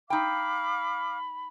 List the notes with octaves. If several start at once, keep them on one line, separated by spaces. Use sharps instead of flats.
D#4 F5 G5 B5 D6 F6